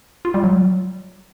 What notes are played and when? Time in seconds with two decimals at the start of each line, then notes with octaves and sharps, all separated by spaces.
0.25 F4
0.34 G3
0.44 F#3